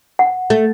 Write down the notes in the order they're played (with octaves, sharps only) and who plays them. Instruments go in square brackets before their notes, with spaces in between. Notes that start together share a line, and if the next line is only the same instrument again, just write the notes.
[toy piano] F#5
[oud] A3